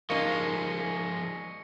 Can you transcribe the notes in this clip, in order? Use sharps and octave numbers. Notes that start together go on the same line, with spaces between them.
F3 G#3 A#3 D#4 C#6 A#6 C#7